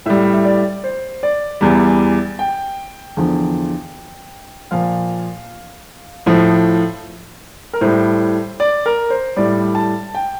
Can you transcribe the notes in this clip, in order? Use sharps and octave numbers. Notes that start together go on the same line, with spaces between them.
A2 G3 E5
E5
D5
C5
D5
E2 E3 G3
G5
E2 D3 F3
A#2 F3 F5
A2 F3
A#4
A2 G3 C5
D5
A#4
C5
A2 G3 D5
A5
G5